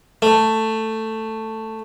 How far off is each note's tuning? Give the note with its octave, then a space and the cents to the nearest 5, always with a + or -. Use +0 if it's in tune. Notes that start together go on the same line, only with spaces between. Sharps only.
A3 +10